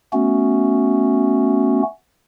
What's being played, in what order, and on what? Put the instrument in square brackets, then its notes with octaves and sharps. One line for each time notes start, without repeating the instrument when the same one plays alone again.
[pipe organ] A3 B3 C#4 F#4